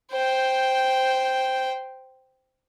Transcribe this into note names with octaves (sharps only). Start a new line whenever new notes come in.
C5 G5